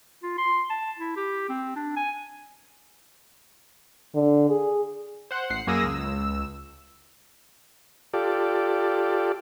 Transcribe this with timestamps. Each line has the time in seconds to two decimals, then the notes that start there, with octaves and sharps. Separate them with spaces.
0.23 F4
0.38 C6
0.70 A5
0.99 E4
1.16 G4
1.49 C4
1.76 D4
1.96 G#5
4.15 D3
4.50 G#4
5.31 C5 F#5
5.50 A1 F#5 C7
5.67 F#2 A#3 G#4 D#6 E6 A#6
5.83 C#2 E6
8.14 F4 G4 A4 D5